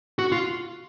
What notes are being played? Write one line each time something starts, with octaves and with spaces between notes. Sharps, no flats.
F#4
F4